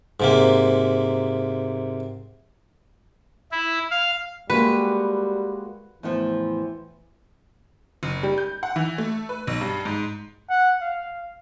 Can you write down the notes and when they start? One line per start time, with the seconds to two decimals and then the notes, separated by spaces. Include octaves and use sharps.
0.20 G#2 C3 A#3
3.52 E4
3.91 F5
4.50 G3 G#3 A#3 F#4 B4
6.03 E2 A2 E3 F3
8.03 F#1
8.23 G3
8.38 G6
8.63 F#5
8.76 E3
8.98 A3
9.29 B4
9.47 B1
9.61 G2
9.85 G#2
10.50 F#5
10.81 F5